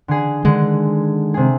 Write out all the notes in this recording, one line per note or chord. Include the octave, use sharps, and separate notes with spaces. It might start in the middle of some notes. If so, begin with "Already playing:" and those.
D3 G#4
D3 D#3 G#3
C3 G#4